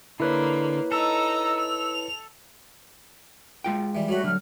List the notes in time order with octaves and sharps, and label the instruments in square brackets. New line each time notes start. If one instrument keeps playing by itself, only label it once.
[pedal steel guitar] D3 [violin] A#3 [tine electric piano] E4 B4 C#5
[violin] D#4 A#5 [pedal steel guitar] A4 [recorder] E6
[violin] F7
[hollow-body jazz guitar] G#3 F4 G5
[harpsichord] E3 G3
[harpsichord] G3 A3 B5 [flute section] F#4 C#5
[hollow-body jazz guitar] D3 F#3 [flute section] F6